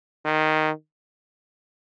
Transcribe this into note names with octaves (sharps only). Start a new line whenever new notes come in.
D#3